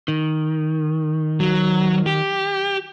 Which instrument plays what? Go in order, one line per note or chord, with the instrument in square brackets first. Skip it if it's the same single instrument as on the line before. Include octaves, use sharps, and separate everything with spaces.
[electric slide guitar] D#3
[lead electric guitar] F#3
G4